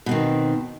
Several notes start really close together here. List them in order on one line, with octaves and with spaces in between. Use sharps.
B2 C4 D#3